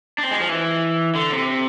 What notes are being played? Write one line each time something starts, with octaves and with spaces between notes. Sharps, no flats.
D4
C4
G#3
F3
E3
D3
C3